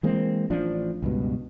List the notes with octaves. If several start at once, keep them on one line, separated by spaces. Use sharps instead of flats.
E3 G#3 A#3 C4
A1 F3 D4
C#2 G2 B2